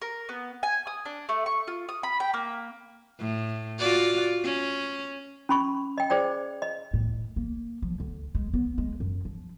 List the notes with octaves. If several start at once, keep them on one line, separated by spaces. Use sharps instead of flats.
A#4
B3
G#5
D#6
D4
A3
C#6
F4
D#6
B5
G5
A#3
A2
F4 F#4 D5
C#4
C#4 B5 C#6
D#5 G5
G#4 C5 D5 G5
D#5
A2
A#3
F3
D2
G#3
B3
G#3
F#2
F3